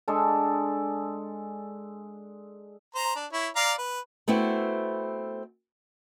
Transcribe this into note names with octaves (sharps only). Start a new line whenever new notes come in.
G#3 D4 A4
C5 A#5
D4
E4 C#5
D5 F5 A#5
B4
A3 B3 C4 E4 F#4